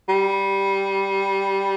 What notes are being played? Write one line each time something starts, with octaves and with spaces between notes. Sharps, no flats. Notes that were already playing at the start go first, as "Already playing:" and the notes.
G3